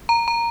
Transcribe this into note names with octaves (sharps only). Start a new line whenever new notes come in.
A#5
A#5